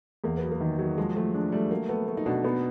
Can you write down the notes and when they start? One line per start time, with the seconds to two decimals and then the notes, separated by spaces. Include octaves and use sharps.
0.24 E2 A#3
0.37 B3
0.43 F#3
0.52 A#3
0.61 D#3
0.79 F#3
0.98 F3 G#3
1.16 F3 A3
1.34 G#3 D4
1.52 G3 A3
1.71 F#3 A#3
1.89 A3 B3
2.07 A3 B3
2.17 D#4
2.26 B2 D4
2.44 B3 D#4